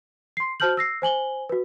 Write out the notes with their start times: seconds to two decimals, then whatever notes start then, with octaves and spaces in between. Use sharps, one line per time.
0.37 C6 C7
0.60 F#4 C5 A5 F6 G6 F#7
0.77 E6 A#6 C7
1.02 C5 G#5 F#7 G7
1.49 F#4 B4